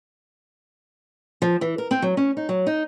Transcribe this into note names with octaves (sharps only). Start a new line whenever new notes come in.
F3
E3
A#4
C4
F#3
C#4
D#4
F#3
D#4